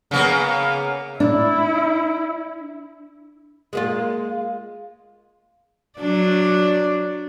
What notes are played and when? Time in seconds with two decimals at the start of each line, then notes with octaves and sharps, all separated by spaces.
0.11 C#3 A#3 B3
1.20 D4 E4
3.73 G#3 A#3 F4
5.99 F#3 D4 D5